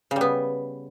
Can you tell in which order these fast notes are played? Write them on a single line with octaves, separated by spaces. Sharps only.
C#3 G3 B3